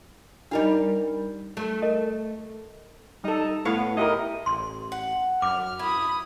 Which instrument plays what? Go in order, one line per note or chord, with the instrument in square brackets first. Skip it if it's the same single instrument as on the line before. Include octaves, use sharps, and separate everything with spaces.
[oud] G3 A#4 F5 [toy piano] D4 D#4 D#5
[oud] A3
[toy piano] A#4 D#5
[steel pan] G3 A4 [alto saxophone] D#4
[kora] A2 C#5 F5 [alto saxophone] B3
[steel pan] E4 G4 A#4 [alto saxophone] D#5
[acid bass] A1 [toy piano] C6
[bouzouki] F#5
[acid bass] F#2 [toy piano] D6 [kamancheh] F6
[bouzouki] E4 [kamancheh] B5 D#6